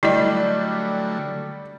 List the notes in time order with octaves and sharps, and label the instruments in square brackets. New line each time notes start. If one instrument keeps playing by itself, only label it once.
[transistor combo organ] D3 F#3 A3 [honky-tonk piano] G3 [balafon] E4 D#5